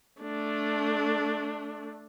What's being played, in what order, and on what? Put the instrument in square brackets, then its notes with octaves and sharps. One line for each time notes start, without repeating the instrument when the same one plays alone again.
[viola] A3 D4